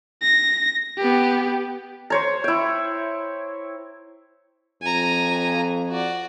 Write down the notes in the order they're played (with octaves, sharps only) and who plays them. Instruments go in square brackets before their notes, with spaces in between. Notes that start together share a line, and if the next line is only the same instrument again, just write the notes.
[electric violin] A#6
B3 G4
[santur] C5 C#5 A#5
E4 G5
[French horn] F2 [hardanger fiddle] G#5 A#5
[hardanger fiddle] F#4 D5